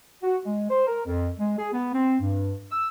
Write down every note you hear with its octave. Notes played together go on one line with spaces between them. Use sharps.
F#4
G#3
C5
A#4
F2
G#3
G#4
B3
C4
G2
E6